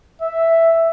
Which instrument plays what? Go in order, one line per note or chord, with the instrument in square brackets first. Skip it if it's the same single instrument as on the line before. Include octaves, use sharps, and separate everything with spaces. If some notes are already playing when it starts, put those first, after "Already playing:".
[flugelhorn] E5